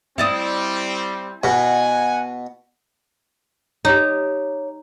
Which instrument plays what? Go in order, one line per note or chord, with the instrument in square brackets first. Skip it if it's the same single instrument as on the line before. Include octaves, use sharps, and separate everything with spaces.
[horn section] G3 C4 [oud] E4 D5 D#5
[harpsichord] B2 [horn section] F#5 G#5
[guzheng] D#4 [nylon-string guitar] G4 C#5